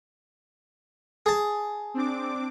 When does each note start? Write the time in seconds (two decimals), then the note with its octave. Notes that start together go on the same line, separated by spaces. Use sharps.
1.26 G#4 A5
1.94 C4 D4 D6